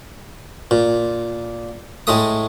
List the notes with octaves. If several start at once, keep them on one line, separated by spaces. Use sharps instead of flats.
A#2
A2 G#3 A3 D#6